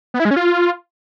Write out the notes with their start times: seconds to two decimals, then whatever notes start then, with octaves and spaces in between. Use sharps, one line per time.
0.14 B3
0.20 E4
0.25 G#3
0.31 C#4
0.36 F4